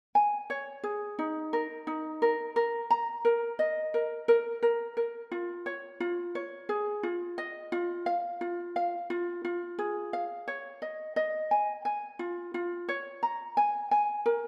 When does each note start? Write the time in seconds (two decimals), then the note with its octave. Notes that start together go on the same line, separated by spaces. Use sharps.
0.15 G#5
0.50 C#5
0.84 G#4
1.19 D#4
1.53 A#4
1.87 D#4
2.22 A#4
2.56 A#4
2.90 A#5
3.25 A#4
3.59 D#5
3.94 A#4
4.28 A#4
4.63 A#4
4.97 A#4
5.32 F4
5.66 C#5
6.00 F4
6.35 C#5
6.69 G#4
7.03 F4
7.38 D#5
7.72 F4
8.06 F5
8.41 F4
8.76 F5
9.10 F4
9.45 F4
9.79 G#4
10.13 F5
10.48 C#5
10.82 D#5
11.16 D#5
11.51 G#5
11.85 G#5
12.19 F4
12.54 F4
12.89 C#5
13.23 A#5
13.57 G#5
13.91 G#5
14.26 A#4